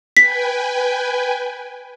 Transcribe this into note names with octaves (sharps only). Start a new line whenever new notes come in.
B4 G5 G#5 B6